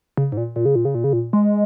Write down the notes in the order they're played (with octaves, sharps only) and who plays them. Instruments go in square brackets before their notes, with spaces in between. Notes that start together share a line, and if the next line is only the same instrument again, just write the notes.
[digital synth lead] C#3
G#2
A#2
A#2
C#3
A#2
C#3
A#2
C#3
A#2
G#3